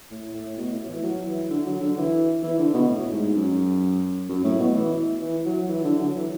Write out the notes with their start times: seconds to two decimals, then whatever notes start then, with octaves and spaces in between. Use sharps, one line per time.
0.11 A2
0.34 A2
0.57 B2
0.73 A2
0.89 E3
1.03 F#3
1.27 E3
1.50 D3
1.66 F#3
1.81 D3
1.97 E3
2.43 E3
2.59 D3
2.74 B2
2.89 A2
3.13 G#2
3.36 F#2
4.29 F#2
4.44 A2
4.60 B2
4.76 E3
5.22 E3
5.46 F#3
5.69 E3
5.84 D3
5.99 F#3
6.16 E3